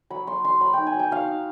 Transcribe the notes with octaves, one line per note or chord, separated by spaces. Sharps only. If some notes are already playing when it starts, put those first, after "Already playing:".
F#3 B5
F#3 C6
F#3 C6
F#3 B5
D#4 G5
G#5
F#3
G5
F#3 F5
D#4